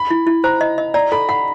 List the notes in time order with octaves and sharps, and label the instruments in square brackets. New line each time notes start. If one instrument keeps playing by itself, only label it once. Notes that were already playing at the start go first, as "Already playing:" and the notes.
Already playing: [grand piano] B5
[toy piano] E4
E4
[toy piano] C5 [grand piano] A#5
[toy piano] D#5
D#5
[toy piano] D5 [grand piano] A#5
[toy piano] A4 [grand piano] B5
[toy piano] F#5 [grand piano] B5